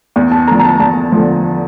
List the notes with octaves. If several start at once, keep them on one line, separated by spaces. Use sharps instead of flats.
E2
A5
D3 F3 A#5
A#5
A5
E2 A5
D3 F3